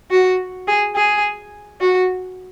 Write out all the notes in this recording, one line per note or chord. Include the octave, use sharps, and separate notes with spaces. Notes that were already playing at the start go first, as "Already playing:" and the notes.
F#4
G#4
G#4
F#4